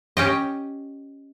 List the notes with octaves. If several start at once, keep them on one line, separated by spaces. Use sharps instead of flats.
C#4 G4 D#5